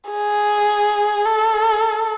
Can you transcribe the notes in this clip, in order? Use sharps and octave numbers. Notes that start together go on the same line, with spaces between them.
G#4
A4